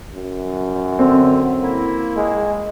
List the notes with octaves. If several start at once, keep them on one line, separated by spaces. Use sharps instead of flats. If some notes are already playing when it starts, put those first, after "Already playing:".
F#2
D3 C4
A#3 E4
G#3